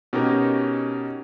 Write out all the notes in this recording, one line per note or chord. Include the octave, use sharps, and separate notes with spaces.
B2 C#4 D#4 G4 A#4